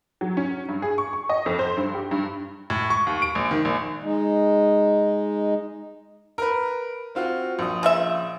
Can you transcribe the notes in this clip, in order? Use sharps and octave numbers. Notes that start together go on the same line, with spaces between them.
F#3
C#4
G2
G#4
C#6
C#6
D#5
F2
C5
G2
G4
G2
A2
C#6
D#2
D7
A#1
D#3
A#1
G#3 D#4
A#4 B4
C4 F4 F#4
A#1 D#6
C#3 F4 E5